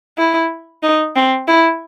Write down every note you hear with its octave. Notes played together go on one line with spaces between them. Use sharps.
E4
D#4
C4
E4